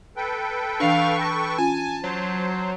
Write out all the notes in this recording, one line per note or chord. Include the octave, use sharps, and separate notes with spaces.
A4 B4 G5
E3 D4 F5 C#6
A5 A#6
C#4 F4 G#5
F#3 C5